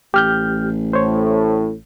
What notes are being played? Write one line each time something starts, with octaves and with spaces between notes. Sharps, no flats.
A1 G4 F6 G6
A2 C5 C#5